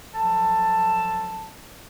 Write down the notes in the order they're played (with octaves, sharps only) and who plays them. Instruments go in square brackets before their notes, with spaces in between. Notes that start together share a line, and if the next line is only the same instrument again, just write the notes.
[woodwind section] F3 F#3 A4 A5